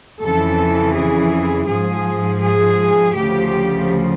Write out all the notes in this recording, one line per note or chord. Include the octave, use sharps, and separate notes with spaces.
F2 C#3 E3 A4
G#4
G#2 F3 G#4
G#4
D2 C#3 F3 G4